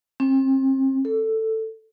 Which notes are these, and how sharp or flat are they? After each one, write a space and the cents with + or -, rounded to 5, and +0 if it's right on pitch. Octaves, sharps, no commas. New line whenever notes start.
C4 +35
A4 +10